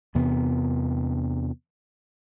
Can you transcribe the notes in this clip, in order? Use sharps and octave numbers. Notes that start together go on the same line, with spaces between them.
E2 C3 B3